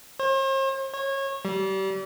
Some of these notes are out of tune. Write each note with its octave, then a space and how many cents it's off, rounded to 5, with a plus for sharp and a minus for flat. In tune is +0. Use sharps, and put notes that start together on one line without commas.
C5 +45
C#5 -25
G3 -30